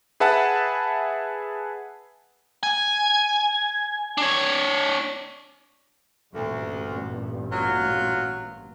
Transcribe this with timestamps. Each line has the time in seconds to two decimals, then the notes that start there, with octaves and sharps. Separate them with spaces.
0.20 G#4 B4 E5 F#5 A5
2.63 G#5
4.18 D4 C#5
6.34 A1 D2 G2 A#2
7.51 F#3 F4